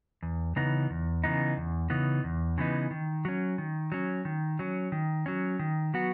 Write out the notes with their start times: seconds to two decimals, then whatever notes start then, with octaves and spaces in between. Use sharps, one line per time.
0.23 E2
0.56 C#3 E3 B3 D#4
0.90 E2
1.24 C#3 E3 B3 D#4
1.57 E2
1.90 C#3 E3 B3 D#4
2.24 E2
2.58 C#3 E3 B3 D#4
2.91 D#3
3.25 F#3 C#4
3.58 D#3
3.92 F#3 C#4
4.25 D#3
4.59 F#3 C#4
4.92 D#3
5.26 F#3 C#4
5.59 D#3
5.94 F#3 B3 F#4